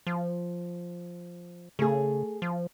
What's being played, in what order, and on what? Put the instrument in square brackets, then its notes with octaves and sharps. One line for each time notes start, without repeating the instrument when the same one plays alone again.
[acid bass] F3
[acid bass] C#3 [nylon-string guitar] A3 G#4
[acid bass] F3